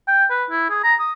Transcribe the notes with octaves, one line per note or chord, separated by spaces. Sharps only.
G5
B4
E4
G#4
A#5
D#6